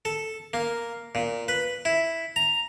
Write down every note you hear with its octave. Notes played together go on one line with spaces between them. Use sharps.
A4
A#3
A#2
B4
E4
A#5